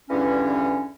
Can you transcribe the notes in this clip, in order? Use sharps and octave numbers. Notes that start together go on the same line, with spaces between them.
E2 G2 D3 E3 C#4